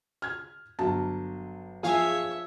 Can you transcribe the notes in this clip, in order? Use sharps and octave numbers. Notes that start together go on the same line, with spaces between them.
F6 G#6
G1 F#3 A5
F3 G#4 C#5 E5 F5